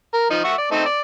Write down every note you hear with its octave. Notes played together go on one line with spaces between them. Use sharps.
A#4
F3 D#4
E5 F#5 C#6
D5
A3 C4 D#4
D5